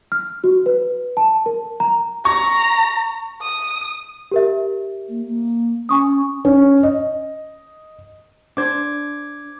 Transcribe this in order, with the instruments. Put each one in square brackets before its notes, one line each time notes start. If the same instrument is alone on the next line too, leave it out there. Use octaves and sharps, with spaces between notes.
[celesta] F6
F#4
B4
A5
A#4
A#5
[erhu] A#5 [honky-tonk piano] C#6
[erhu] D#6
[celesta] G4 A#4 E5
[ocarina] A#3
A#3
[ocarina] C#4 [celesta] G#5 C#6 D#6
[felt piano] C#4
D#5
[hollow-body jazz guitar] D4 C5 [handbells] D6 G#6